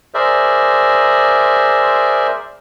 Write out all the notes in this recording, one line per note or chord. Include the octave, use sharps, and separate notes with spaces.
G#4 A#4 C5 D5 E5